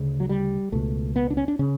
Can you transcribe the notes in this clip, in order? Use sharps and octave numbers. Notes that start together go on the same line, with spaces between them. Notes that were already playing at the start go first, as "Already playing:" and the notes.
Already playing: D2 C#3
F#3
G3
C#2 B2 A3
B3
D4
C#4
D4
C#3 C#4